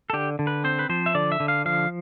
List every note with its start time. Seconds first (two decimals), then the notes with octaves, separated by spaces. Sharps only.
0.10 A4
0.13 D3 G4
0.39 D3
0.47 B4
0.64 C4 C5
0.79 B4
0.89 F3 C5
1.06 E5
1.14 D3 D5
1.32 E5
1.40 D3
1.48 F5
1.65 F3 F5